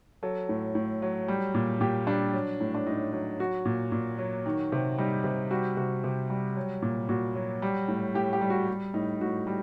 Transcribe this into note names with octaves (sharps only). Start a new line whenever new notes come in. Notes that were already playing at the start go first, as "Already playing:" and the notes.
F#3 A4
A2
A2
F#3
G3
A#2
A#2 G4
G3 D4
F#3
A2
D4
A2 D#4
F#3
F#3 F#4
A#2
A#2
F#3
D#3
C3
G3 D#4
C3
G3 F#4
C3 F#4
C3
G3
F#3
A#2
A#2 F#4
F#3
G3
A2
A2 G4
G4
G3
F#4
G3
A2 D#4
A2 F#4
G3